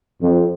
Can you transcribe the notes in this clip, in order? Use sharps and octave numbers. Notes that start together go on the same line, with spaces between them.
F2